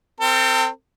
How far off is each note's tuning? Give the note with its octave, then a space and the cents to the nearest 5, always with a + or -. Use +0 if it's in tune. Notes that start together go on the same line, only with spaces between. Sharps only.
C4 +0 A4 +45